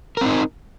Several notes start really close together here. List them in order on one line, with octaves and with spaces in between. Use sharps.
A#4 C4 D#4